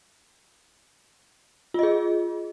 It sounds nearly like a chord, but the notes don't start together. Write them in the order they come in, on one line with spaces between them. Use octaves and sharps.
F4 D#5 G#4